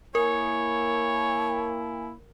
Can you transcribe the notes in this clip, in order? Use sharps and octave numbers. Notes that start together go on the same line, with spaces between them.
A#3 E4 A#4 C#5 G#5